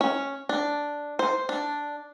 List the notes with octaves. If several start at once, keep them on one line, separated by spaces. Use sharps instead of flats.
C#4
D4
C5
D4